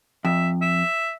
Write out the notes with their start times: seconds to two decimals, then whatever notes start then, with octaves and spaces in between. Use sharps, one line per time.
0.25 F2 E5
0.62 E5